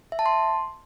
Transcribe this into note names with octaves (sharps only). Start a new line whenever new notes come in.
E5
A5
C6